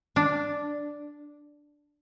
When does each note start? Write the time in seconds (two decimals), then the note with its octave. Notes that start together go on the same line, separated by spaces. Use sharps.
0.16 D4